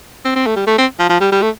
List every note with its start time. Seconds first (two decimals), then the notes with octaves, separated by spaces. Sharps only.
0.25 C4
0.36 C4
0.46 A3
0.56 G3
0.67 A3
0.78 C4
0.99 F3
1.09 F3
1.21 G3
1.32 G3
1.42 A3